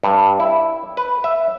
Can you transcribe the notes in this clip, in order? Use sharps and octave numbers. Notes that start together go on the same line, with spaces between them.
G2
E4
B4
E5